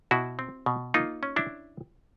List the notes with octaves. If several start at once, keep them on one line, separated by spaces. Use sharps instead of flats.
B2 E4 F#4
C4
B2
A#3 D#4 F4
C#4
D4 E4